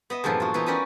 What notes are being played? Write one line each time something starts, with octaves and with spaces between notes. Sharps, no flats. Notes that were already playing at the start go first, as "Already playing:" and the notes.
B3 D#5 E5
E2 G2 A#2 F3 A4
F4 F#4
E3 F3 B3 D#4 F4
C#4 F#4 A#4 B4 D5 G5